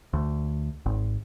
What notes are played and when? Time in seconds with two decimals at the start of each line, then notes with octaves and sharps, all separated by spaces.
0.13 D2
0.86 G#1